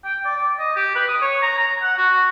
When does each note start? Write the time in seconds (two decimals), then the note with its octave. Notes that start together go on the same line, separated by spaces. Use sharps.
0.04 G5
0.25 D5
0.37 D5
0.59 D#5
0.76 G4
0.95 B4
1.08 D#6
1.22 C#5
1.42 A#5
1.58 A#5
1.82 F#5
1.98 F#4